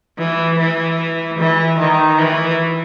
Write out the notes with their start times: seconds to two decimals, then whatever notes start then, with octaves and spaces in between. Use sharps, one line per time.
0.18 E3
0.59 E3
1.38 E3
1.79 D#3
2.18 E3